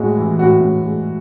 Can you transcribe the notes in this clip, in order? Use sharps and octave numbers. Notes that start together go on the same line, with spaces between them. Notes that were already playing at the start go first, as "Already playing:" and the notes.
Already playing: A2 G#3 F#4
E3
A2 F#4
A2
G#3